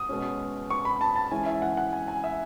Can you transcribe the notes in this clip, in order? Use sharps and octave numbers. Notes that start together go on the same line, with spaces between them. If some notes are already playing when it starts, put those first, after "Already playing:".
Already playing: D#6
B2 G#3 C#4
C#6
B5
A5
A5
E3 G#3 C#4 E4 G#5
E5
F#5
F#5
G#5
G#5
E5